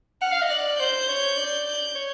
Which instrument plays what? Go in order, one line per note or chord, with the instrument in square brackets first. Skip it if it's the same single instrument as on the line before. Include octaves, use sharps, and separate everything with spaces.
[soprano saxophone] F#5 [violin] F6
[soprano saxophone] F5
D#5
[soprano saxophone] D5 [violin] F#6
[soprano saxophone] C5 [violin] G6
[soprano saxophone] C#5
D5
[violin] G6
[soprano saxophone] C#5